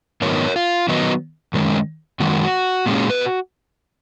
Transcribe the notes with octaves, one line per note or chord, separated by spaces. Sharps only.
G#2 D#3 F#3 B3 D#4 A#4 C#5
F4
D#3 F#3 B3 D#4
F#2 D#3 G#3 C#4
F#2 D#3 G#3 F#4
A#2 G#3 C#4
B4